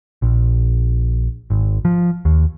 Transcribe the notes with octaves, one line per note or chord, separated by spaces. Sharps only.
A#1
G#1
F3
D#2